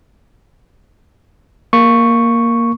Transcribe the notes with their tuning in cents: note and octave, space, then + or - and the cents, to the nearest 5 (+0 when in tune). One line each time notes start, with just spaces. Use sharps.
A#3 +0 C#6 +0